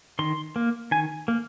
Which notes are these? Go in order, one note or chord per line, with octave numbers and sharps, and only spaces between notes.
D#3 C6
A#3
D#3 G#5
A#3